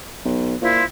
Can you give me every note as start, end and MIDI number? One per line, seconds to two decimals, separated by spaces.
0.25 0.55 35
0.62 0.82 46
0.62 0.83 64
0.62 0.83 65
0.62 0.83 72